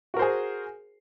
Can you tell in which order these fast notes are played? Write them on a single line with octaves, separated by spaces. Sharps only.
F#4 A#4 C5 G#4